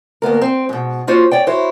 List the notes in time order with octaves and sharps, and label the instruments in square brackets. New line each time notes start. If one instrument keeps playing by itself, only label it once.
[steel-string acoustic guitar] D2 A#3 B3 A#4
C4
G#2 B2
A#3 F4 F#4 C5 C#5
C#5 D5 G5
E4 F#4 C5 C#5